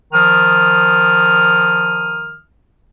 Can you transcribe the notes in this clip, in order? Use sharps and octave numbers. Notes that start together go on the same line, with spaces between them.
D#3 F3 D#6 F6